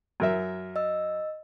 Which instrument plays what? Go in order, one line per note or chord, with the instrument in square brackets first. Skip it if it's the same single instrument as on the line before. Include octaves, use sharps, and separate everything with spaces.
[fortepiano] F#2 A#4 E5
[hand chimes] D#5 E6